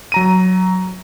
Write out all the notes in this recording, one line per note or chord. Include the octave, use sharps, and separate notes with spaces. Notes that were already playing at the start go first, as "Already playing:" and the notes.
F#3 A#5 D#7